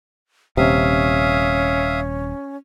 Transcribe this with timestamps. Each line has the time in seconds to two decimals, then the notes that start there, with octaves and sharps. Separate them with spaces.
0.57 D#1 C3 C#4 E5 F5 D#6